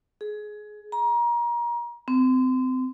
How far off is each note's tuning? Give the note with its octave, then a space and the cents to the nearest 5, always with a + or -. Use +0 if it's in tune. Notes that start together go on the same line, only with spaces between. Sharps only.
G#4 +20
A#5 +30
C4 -30